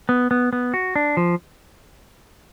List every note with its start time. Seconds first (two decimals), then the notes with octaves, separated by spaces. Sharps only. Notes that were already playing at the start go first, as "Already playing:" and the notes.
0.09 B3
0.31 B3
0.53 B3
0.74 F#4
0.96 D4
1.17 F3